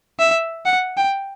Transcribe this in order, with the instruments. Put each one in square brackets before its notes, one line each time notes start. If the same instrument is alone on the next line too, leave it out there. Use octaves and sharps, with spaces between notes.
[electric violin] E5
F#5
G5